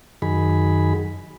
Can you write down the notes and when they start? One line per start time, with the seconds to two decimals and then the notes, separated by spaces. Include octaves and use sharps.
0.22 F#2 D#3 G#4 B5